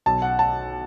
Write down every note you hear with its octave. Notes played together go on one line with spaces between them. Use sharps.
B1 A5
F#5
A5